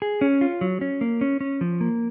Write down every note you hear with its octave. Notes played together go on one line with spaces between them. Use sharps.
G#4
C#4
F4
F#3
C#4
A#3
C#4
C#4
F3
A#3